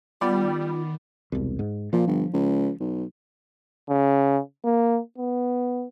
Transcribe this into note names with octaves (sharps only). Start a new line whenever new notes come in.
D#3 G3 B3 F4 D5
E1 C2
G#2
A#2 F3
G1
C#2
B1
C#3
A#3
B3